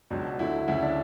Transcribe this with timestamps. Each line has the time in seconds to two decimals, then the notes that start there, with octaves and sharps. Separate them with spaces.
0.10 C#2 B2 F#3 D4
0.39 D2 D3 F#3 E4
0.67 D2 C#3 F#3 E4
0.82 D4